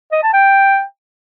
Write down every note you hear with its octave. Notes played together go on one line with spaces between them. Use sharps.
D#5
A5
G5